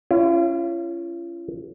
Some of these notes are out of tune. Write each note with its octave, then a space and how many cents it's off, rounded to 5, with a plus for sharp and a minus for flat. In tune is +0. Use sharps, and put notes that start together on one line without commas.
C#4 +0 F4 -45